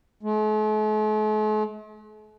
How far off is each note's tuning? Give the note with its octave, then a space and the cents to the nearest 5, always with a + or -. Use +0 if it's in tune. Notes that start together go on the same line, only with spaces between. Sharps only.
A3 -45